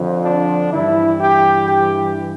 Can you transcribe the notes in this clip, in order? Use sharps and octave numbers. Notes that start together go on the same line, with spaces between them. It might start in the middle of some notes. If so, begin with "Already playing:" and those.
Already playing: F2 D3 F3
D4
G2 E3 E4
G4
G4